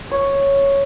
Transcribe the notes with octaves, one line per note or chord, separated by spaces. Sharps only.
C#5